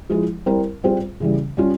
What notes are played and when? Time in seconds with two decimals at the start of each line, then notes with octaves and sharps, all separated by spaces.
0.10 F3 G#3 E4 G#4
0.46 G3 C4 E4 A#4
0.84 G3 C4 F4 G#4
1.20 C#3 E3 G3
1.57 G3 C#4 F4